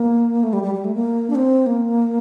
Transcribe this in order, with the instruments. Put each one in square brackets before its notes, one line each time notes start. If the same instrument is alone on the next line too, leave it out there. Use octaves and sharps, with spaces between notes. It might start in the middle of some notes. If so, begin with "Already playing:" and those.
Already playing: [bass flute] A#3
A3
G3
G3
G3
A3
A#3
D4
C4
A#3